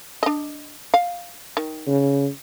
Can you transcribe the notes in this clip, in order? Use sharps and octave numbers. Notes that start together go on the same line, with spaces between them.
D4 D#5
F5
D#3
C#3